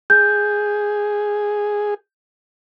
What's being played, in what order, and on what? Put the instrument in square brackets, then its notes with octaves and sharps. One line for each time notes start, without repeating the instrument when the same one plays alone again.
[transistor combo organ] G#4 [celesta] G6